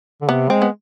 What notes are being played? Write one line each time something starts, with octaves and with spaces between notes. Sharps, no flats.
D3
C3 B3
G#3 C4
B3